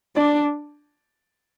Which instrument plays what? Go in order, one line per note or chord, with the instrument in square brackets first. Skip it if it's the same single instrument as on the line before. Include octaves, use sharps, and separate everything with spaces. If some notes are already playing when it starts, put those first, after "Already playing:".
[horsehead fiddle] D4 [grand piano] D5